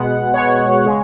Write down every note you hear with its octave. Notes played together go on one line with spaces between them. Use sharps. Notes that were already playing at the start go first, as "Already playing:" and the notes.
Already playing: B2 G#3 B3 F#5
B2 G#3 B3 C#5
C#3 G#3